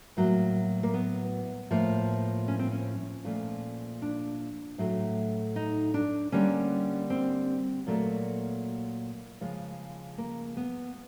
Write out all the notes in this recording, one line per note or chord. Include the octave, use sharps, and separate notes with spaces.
A2 F#3 A#3
A#3
B3
A2 F3 A#3
C#4
C4
C#4
A#2 F3 A3
D4
A2 F#3 A3
D#4
D4
D3 G3 A#3 C#4
C4
A#2 F#3 A3 A#3
C#3 F3 G#3
A#3
B3